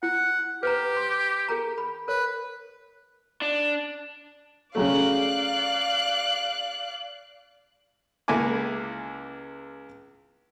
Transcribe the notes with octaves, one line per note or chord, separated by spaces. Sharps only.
E4 F#5
G4 B4 C5 A#5
C6
G#4 A#4 A#5
B5
A#4 B4 C#5
D4
C#3 F#3 A3 D5 F5 F#6
C#2 A#3 E4 A4 G#5 D6